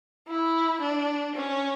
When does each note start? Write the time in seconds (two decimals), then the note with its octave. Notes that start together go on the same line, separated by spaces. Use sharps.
0.27 E4
0.81 D4
1.35 C#4